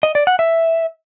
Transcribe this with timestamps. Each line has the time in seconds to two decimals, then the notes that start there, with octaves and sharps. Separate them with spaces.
0.03 D#5
0.15 D5
0.27 F#5
0.39 E5